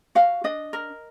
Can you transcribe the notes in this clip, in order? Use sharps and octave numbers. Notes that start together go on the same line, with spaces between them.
F#4 F5
D4 D#5
A#4